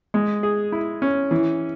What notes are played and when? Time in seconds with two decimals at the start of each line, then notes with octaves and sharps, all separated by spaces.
0.14 G#3
0.43 G#4
0.72 E4
1.02 C#4
1.31 E3